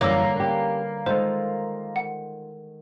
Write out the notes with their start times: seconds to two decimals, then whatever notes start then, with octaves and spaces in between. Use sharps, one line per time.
0.01 F#2 D3 E3 G3 A#3 C#5 D6 E6
0.36 C#4 G4 B4
1.06 D#3 G#3 D#4 F4 A4 C5
1.96 F#5